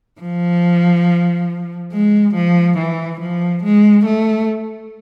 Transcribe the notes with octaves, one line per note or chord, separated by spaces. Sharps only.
F3
G#3
F3
E3
F3
G#3
A3